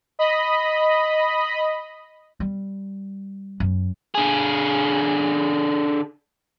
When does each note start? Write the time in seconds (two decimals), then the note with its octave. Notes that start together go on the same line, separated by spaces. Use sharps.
0.19 D#5 B5
2.40 G3
3.60 F#2
4.15 D3 G#4